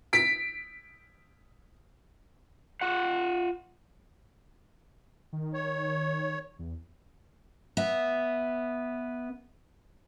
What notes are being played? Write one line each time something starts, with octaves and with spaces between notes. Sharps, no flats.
B6 D7
F4 F#5
D#3
C#5
E2
B3 E5